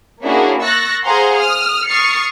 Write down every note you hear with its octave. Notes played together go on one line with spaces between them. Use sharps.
A#3 C#4 D4 E4 F#4 G#4
C#6 E6 F#6 A6 A#6
G#4 C5 F5 F#5 A#5 C6
D#6 F6
C#6 D#6 F6 A6 C7 C#7